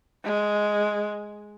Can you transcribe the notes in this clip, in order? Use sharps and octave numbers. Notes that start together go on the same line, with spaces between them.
G#3